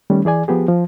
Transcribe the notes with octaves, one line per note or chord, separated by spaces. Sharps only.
D#3 G3 A3 C#4
E3 G#4 D5 G#5
F3 B3 G4 G#4
F3